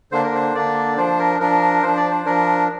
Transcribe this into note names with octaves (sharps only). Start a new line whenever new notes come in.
D3 A#3 D4 C5
A#4
C5
D3 A#3 D4 D5
F3 D4 C5
A#4
F3 D4 A#4
F3 D4 C5
D5
C5
F3 D4 A#4